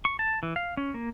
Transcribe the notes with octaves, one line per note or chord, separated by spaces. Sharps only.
C#6
A5
E3
F5
C#4
A#3